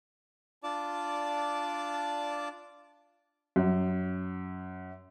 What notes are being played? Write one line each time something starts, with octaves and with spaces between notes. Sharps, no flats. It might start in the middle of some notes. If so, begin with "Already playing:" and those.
D4 F4 D5 A5 D6
F#2